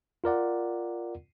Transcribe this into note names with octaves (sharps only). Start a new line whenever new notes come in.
F4 A#4 D5 F#5